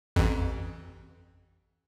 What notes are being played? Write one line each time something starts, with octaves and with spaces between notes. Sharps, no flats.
A1 F2